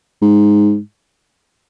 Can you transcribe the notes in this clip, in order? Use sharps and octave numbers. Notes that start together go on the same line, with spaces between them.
G#2